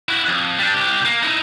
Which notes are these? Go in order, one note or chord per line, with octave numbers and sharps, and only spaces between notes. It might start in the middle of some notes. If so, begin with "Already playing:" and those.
E4 F#4
F2
G3 D4
C2 G4
A#3
D#4 E4